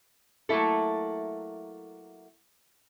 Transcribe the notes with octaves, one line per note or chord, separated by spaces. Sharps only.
F#3 A3 A#3 E4 A4